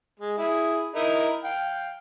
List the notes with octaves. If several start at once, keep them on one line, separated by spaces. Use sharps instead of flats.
G#3
E4 G#4
D#4 E4 A#4
F5 G5